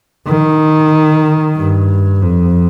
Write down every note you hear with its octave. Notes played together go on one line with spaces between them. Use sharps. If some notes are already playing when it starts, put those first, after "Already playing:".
D#3
G2
F2